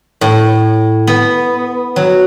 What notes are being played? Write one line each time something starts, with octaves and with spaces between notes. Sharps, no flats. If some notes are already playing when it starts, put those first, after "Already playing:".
A2
B3
F#3